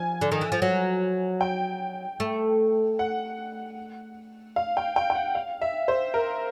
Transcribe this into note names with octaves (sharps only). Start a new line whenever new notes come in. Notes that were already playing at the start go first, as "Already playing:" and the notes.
Already playing: F3 G#5
D3
D#3
E3
F3
F#3
G5
A3
F#5
F5
G5
G5
G5
F#5
F5
E5
C5
A#4